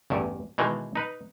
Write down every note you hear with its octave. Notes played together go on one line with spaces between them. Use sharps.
A1 E2 G2
B2 D#3 E3 G#3
D#4 B4